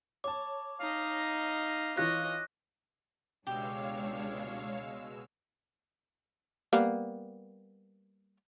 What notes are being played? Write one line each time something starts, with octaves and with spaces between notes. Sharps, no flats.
C#5 A5 D6
D#4 D#5 F5
E3 F4 C#5 D#5 F#6 A#6
C#2 B2 G#3 D4 G4 C#5 F5 E6
G3 A#3 B3